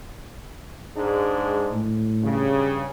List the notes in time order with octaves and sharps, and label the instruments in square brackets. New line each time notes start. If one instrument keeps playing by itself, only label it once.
[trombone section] G#2 G#3 D4
[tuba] A2
[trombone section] G2 C#3